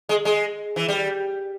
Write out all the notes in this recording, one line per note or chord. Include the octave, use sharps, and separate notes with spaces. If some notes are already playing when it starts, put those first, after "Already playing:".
G#3
G#3
E3
G3